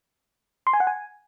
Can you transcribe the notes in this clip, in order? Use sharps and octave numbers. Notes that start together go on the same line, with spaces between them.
C6
G#5
F#5
G#5